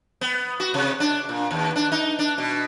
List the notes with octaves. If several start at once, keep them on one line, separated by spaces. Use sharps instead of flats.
B3
F#4
C3
D4
A#2
D#2
D4
D#4
D4
B2